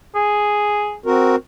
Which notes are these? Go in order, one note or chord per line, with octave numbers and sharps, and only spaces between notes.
G#4
C4 F#4 A#4